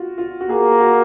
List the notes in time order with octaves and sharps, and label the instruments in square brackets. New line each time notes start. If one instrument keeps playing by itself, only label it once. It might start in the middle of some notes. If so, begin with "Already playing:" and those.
Already playing: [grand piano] F4 F#4
F4
F#4
[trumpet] A#3 [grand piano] G#4
[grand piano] F#4